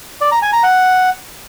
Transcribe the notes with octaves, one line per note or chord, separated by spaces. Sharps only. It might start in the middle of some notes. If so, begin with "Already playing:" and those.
D5
A#5
G#5
A#5
F#5